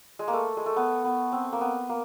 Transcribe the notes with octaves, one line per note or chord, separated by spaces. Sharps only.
G#3
A#3
A3
G#3
A3
B3
B3
C4
A#3
B3
A#3